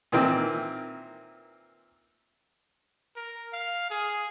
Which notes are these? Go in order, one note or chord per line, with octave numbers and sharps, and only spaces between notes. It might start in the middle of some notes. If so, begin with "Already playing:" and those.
A#2 D#3 E3 A#3 C4
A#4
F5
G#4